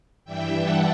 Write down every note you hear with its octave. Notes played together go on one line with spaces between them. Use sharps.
G2 E3 G3 E5 G5
F#5 A5